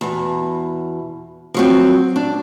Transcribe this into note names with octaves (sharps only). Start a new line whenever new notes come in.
E2 B2
F3 F#3 C4
D4